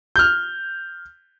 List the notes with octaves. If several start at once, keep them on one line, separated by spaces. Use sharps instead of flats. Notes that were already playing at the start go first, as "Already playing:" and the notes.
F6 G6